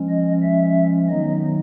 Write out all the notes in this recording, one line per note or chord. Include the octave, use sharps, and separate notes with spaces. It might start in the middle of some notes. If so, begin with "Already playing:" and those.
Already playing: F3 G#3 C#4
D#5
E5
D#3 F#3 B3 D#4 D#5